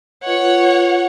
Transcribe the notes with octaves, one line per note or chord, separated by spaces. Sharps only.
F4 B4 C#5 D#5 F#5